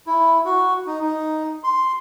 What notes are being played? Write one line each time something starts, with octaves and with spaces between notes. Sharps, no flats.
E4
F#4
D#4
D#4
C6